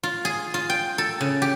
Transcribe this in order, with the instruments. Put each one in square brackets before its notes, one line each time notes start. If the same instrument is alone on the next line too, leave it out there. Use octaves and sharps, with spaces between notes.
[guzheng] F4
G#4
F4
G5
A4
C#3
G4